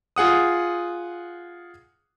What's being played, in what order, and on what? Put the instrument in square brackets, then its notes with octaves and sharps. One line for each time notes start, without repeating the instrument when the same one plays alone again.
[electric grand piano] F4 G#4 F#5 D#6